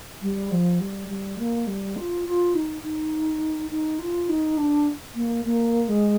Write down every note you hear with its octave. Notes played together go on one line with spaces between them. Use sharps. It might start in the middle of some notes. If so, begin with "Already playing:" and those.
G3
F3
G3
G3
A#3
G3
F4
F4
D#4
D#4
D#4
F4
D#4
D4
A#3
A#3
G#3